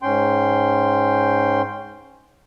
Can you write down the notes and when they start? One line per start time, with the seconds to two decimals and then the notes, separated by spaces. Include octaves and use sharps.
0.02 G#2 C#4 G5 C6